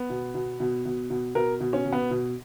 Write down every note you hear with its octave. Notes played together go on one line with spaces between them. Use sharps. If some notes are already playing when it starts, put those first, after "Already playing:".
Already playing: B3
B2
B2
B2
B2
B2
B2 A#4
B2
C#4
B2
B3
B2